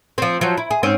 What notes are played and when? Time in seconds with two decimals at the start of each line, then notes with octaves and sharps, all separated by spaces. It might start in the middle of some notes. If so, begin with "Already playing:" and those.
0.18 F3 C4
0.41 F3 F#3 C5
0.57 E4
0.71 G#4
0.83 G#2 C4 C#4